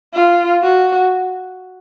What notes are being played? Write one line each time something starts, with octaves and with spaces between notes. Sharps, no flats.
F4
F#4